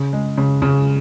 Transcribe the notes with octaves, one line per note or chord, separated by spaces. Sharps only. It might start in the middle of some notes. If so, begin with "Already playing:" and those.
Already playing: C#3
G#3
C#3
C#3